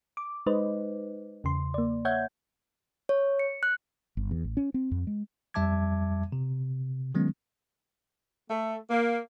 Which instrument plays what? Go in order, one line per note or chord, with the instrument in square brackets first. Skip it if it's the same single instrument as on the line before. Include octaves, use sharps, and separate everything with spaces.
[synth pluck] D6
G#3 D#4 B4 C5 D#5
E2 C#3 C6
A#3 D5
C#5 E5 F#5 G6 G#6
[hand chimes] C#5
C#7
F#6
[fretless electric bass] G1
E2
A1
C#4
C4
F2
G#3
[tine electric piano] F2 G3 E5 A5 D6 G#6
C3
D#3 F#3 G#3 B3 C#4
[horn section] A3
A#3